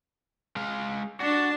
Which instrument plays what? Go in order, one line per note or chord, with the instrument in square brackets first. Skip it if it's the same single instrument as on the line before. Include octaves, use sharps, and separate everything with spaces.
[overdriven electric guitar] G#3 F5
[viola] D4 A5 [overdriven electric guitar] F#4